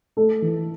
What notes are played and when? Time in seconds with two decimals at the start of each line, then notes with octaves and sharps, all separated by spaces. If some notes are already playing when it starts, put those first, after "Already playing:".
0.17 A3 A4
0.42 E3